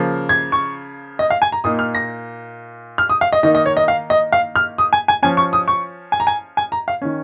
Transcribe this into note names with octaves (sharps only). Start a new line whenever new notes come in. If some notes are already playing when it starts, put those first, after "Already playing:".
Already playing: C#3 F3 A#3
G#6
C#6
D#5
F5
G#5
A#5
A#2 A#3 D#4 D#6
F6
A#6
F6
D#6
F5
D#5
D#3 A#3 D#4 D#5
D#5
C#5
D#5
F5
D#5
F5
F6
D#6
G#5
G#5
F3 C#4 G#5
C#6
D#6
C#6
G#5
A#5
G#5
G#5
A#5
F5
D#3 C#4